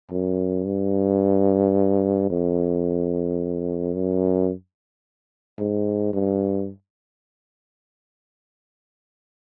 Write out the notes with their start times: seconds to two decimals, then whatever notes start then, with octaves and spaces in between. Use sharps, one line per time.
0.11 F#2
0.66 G2
2.30 F2
3.94 F#2
5.59 G#2
6.13 G2